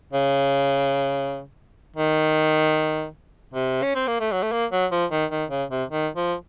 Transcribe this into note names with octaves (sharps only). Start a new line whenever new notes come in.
C#3
D#3
C3
C#4
C4
A#3
A3
F#3
A3
A#3
F#3
F3
D#3
D#3
C#3
C3
D#3
F3